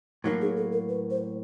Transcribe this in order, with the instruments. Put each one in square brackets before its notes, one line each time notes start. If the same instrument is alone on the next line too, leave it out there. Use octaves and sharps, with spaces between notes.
[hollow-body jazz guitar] A2 F#3 A#3 [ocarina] D#4
[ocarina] G#4
A4
A#4
B4
C5